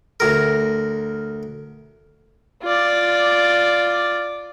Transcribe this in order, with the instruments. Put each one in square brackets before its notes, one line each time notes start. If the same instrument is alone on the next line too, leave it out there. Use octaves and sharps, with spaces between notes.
[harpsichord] D2 A#4
[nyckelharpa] F4 D5